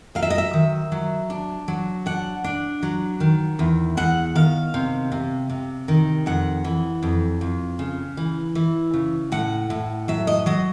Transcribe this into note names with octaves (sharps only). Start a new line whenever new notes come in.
F#3 F5
E5
D#5
E5
D#3
F#3
D4
F#3
D4 F#5
D4
F#3
D#3
E2
E2 F#5
D#3 F5
C3
C3
C3
D#3
F2 F#5
E3
F2
F2
C#3
E3
E3
C#3
A2 F#5
A2
F#3 E5
D#5
F#3 D#5